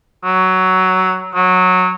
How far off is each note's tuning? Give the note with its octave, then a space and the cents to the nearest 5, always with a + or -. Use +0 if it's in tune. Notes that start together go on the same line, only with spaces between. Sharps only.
F#3 +10
F#3 -15